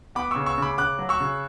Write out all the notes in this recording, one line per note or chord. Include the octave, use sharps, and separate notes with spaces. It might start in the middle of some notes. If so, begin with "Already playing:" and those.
B3 B5 D6
C#3 C#6 E6
C#6 E6
C#3 B5 D6
C#3 D6 F#6
F#3
C#6 E6
C#3